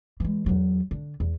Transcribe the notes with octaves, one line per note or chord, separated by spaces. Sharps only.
E3 G#3
E2 F#3
D3
E2